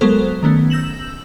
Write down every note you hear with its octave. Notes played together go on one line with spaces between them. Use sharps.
F#3 G#3 B3 A4 A#4 C5
D#3 A3 B3 C#4
E6 G6 A#6 E7 F#7